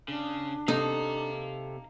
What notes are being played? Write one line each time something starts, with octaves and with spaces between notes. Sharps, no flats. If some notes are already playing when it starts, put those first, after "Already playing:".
C#3 D4
C3 D#4 A4 F5 A#5